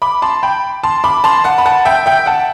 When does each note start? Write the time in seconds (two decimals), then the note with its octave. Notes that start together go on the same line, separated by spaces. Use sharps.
0.02 B5 D6
0.22 A5 C6
0.43 G5 B5
0.83 A5 C6
1.04 B5 D6
1.24 A5 C6
1.44 F#5 A5
1.58 B5
1.66 F#5 A5
1.85 E5 G5
2.06 E5 G5
2.26 F#5 A5